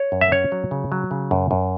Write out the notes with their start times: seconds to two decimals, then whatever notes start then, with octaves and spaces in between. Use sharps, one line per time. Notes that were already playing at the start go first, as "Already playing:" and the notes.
Already playing: C#5
0.12 F#2
0.21 E5
0.32 C#4 C#5
0.52 F#3
0.71 C#3
0.92 F#3
1.11 C#3
1.31 F#2
1.51 F#2